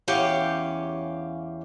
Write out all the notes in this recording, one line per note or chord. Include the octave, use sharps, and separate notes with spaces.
E2 C#4 G4 F5